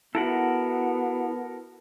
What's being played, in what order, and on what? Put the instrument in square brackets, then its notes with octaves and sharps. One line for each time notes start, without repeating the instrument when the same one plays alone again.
[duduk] B3 [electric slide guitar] E4 F#4 [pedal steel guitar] A4 A#4 F#5